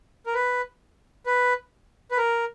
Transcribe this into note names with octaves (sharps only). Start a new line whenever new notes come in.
A#4
B4
B4
B4
A#4